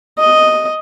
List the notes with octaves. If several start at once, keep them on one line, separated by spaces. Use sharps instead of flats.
D#5